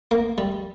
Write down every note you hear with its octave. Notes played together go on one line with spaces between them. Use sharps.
A#3
G3